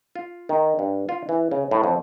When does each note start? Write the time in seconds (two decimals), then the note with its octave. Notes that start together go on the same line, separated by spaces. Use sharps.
0.15 F4
0.49 D#3
0.79 G2
1.09 F4
1.29 E3
1.51 C#3
1.71 A2
1.84 F2